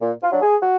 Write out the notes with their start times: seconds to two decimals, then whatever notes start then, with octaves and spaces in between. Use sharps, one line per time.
0.02 A#2
0.23 F4
0.32 F#3 D4
0.42 G#4
0.62 F#4